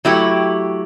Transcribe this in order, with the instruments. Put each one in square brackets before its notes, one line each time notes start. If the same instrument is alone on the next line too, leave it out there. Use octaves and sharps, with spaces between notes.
[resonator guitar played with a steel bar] F#3 A3 E4 G4